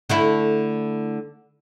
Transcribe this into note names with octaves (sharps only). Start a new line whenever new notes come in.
D3 A3 E4